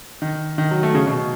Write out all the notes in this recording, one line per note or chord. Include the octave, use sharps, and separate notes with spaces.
D#3
D#3
F#3
A3
C#3
B2